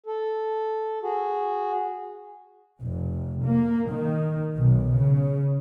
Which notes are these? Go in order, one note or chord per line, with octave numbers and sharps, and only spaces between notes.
A4
F#4 G#4
F1
A#3
D#3
B1
C#3